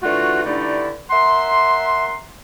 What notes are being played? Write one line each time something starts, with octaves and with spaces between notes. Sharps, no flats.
D3 E3 A3 F4 F#4
G2 D3 A3 D#4 E4 D5
A#4 E5 F#5 C6